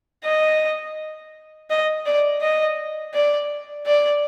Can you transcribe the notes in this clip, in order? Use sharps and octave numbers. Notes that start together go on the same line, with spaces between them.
D#5
D#5
D5
D#5
D5
D5